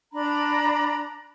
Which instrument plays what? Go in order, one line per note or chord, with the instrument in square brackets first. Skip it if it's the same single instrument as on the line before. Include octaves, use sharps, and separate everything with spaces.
[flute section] D4 A#5 B5